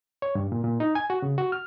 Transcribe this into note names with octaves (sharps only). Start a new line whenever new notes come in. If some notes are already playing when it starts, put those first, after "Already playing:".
C#5
G2
A#2
A#2
D#4
G#5
F#4
C#3
F#4
F6